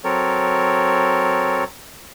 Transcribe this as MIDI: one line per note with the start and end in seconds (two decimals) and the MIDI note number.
0.04 1.64 54
0.04 1.64 60
0.04 1.64 69
0.04 1.64 70
0.04 1.64 73